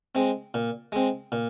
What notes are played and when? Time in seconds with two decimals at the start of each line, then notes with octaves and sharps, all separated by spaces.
0.15 G#3 C4
0.54 A#2
0.92 G#3 C4
1.32 A#2